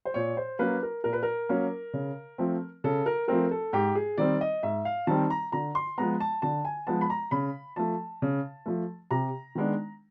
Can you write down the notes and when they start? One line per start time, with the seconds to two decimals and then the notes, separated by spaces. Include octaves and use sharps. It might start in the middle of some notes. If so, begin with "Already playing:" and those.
0.05 C5
0.14 A#2 C#5
0.37 C5
0.59 F#3 A#3 C#4 B4
0.83 A#4
1.04 A#2 A#4
1.13 B4
1.23 A#4
1.49 F#3 A#3 C#4
1.93 C#3
2.38 F3 A3 C4
2.84 C#3 A4
3.06 A#4
3.28 F3 A3 C4 A#4
3.51 A4
3.73 G#2 G4
3.95 G#4
4.18 D#3 G3 C4 D5
4.41 D#5
4.63 G#2 E5
4.85 F5
5.07 D#3 G3 C4 A5
5.30 A#5
5.52 D3 A#5
5.75 C6
5.98 F3 G#3 B3 A#5
6.20 A5
6.42 D3 A5
6.65 G#5
6.87 F3 G#3 B3 A5
7.01 B5
7.10 A#5
7.31 C#3 B5
7.76 F3 A3 A5
8.22 C#3
8.66 F3 A3
9.11 C3 A#5
9.55 D#3 G#3 B3 D4